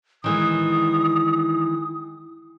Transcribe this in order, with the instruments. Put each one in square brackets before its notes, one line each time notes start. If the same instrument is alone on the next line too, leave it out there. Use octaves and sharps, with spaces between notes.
[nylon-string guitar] D#3 E3 G#3 [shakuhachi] D#6